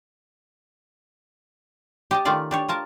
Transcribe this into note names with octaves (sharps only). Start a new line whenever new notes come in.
G4 D#5 A5
D#3 A3 C#4 F4 D5 F5
D4 G4 C#5
F4 A#4 A5